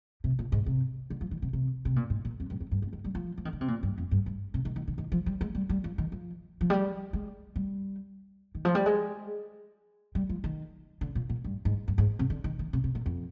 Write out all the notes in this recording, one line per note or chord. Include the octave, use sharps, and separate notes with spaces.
C3
A#2
G#2
C3
D3
F3
D#3
C3
C3
C3
A#2
G#2
A#2
F2
G2
F2
G2
G#2
D#3
G3
F3
F3
D#3
D3
C3
A#2
G2
F2
G2
G2
C3
D#3
D#3
D3
D#3
F3
G3
G#3
G3
G3
F3
D#3
F3
F3
G3
G#3
G3
D#3
F3
G3
G#3
G3
F3
D#3
D3
A#2
A#2
G2
G#2
G2
G#2
C3
D3
D#3
D#3
C3
C3
A#2
F2